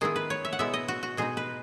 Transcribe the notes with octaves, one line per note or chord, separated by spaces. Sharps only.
D#3 G#3 B3 E4 G#4
B4
C#5
E5
F#5
B2 G#3 B3 E4 E5
D#5
F#4
F#4
B2 G#3 D#4 G#4
B4